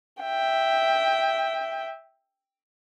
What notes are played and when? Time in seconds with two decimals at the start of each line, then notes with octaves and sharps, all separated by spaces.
0.22 E5 G5